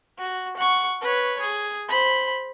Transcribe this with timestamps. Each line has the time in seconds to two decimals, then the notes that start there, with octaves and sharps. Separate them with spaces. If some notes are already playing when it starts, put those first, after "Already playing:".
0.18 F#4
0.57 F#5 C#6
1.01 B4 C#5
1.41 G#4
1.89 C5 B5